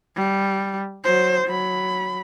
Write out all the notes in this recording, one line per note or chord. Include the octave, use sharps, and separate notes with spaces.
G3
F#3 C5
F#3 B5